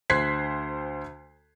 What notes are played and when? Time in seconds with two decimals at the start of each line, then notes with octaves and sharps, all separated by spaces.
0.10 D2 C5 F#6 G#6 B6 C7